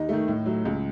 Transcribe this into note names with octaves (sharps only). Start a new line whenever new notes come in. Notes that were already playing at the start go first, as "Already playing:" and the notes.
Already playing: D#2 D#4
D#3 A3
A2
F#3 A3
C#2